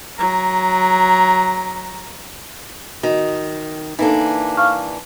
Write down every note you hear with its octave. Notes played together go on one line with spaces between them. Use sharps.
F#3 A#5
D#3 F#4 D#5
E3 A#3 D4 D#4 A4
F5 C#6 F6